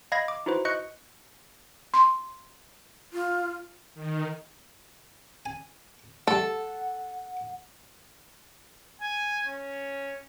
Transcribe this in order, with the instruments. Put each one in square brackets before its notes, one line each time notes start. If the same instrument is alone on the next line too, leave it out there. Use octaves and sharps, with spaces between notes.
[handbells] D#5 F5 B5 G#6 A#6
D6
D#4 E4 F#4 B4 C5
D#5 C#6 F#6 G6 C#7
[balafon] C6
[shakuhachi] F4
[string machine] D#3
[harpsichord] G#5
[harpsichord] G3 A3 [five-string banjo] A4 [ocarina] F#5
[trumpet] G#5
C#4